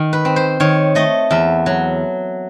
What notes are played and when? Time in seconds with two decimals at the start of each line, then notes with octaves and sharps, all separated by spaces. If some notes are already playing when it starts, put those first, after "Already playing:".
Already playing: D#3
0.13 B4
0.25 C4
0.36 C5
0.60 D#3 C#5
0.95 A3 D#5
1.31 E2 E5
1.66 F#3